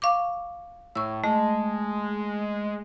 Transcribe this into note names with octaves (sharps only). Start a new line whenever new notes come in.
F5 C#6 D6
A2 C#6 E6
G#3 A3